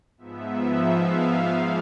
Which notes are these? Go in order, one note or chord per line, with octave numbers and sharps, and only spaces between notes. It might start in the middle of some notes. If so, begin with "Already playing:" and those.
G#2 F3 B3 E5
F5
G#2 F3 G#3